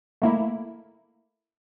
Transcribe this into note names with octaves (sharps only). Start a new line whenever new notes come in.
A3 A#3 E4